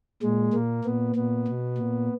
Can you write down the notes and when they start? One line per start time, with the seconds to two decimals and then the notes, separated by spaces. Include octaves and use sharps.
0.23 A#2 G#3
0.54 A#2 A#3
0.85 A#2 B3
1.16 A#2 B3
1.48 B2
1.78 A#2